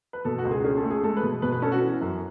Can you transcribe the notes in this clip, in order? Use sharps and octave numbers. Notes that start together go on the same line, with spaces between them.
B4
B2 A4
F#4
C#2
G#4
C#4 G#4
A4
A3
G#4
G#3 A4
B4
B2
B2 B4
B4
C#4 A4
F#4
E3
F#2